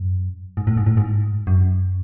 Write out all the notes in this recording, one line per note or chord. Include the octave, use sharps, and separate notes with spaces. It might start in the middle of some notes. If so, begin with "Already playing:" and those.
Already playing: F#2
G#2
A2
G#2
A2
G#2
F#2